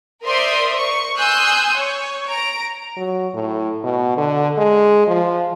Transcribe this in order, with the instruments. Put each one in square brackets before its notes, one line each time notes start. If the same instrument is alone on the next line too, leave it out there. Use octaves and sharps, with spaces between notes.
[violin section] A#4 C5 D5 E5 C6 D#6
C#6
G#5 C6 D#6 E6 F#6 G6
C#5
A#5 D7
[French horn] F#3
A2
B2
D3
G#3
F3